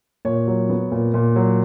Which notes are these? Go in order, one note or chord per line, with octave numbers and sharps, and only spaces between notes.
A#2 C#5
F#3
B3
A#2
A#2
F#3